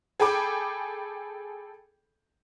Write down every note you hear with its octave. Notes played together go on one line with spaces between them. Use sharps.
G#4 A4 G5 B5 D6